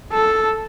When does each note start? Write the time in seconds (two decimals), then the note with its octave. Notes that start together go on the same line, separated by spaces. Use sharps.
0.12 A4